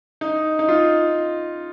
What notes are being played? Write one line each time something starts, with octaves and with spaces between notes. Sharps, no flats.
D#4
D#4
F4